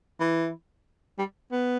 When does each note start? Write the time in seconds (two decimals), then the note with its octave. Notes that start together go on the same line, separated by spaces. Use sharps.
0.20 E3
1.18 G3
1.52 B3